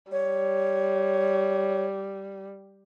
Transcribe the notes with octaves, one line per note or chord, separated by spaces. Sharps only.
G3 C#5